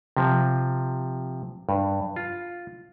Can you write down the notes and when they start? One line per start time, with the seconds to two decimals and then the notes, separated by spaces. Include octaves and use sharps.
0.17 C3 F3
1.69 G2
2.16 F4